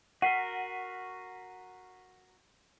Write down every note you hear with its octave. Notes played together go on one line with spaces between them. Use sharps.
F#4 A#4 F#5 B6 C7 D#7